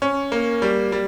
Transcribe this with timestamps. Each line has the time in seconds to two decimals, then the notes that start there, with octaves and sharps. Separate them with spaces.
0.02 C#4
0.32 A#3
0.62 G3
0.92 G3